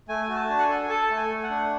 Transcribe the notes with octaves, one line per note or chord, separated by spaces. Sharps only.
A3 G#5
F#4
A5
D4
F#5
G#5
A4
A4 A5
A3
G#5
A3
F#5
D4